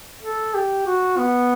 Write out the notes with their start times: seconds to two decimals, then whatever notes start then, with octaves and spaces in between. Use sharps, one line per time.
0.23 A4
0.55 G4
0.87 F#4
1.18 B3